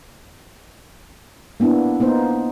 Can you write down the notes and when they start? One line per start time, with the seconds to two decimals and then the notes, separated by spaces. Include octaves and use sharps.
1.60 A#3 B3 D4 E4
2.00 A#3 B3 D#4 C5